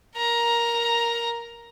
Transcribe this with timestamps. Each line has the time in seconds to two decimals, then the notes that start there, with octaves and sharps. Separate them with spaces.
0.17 A#4 A#5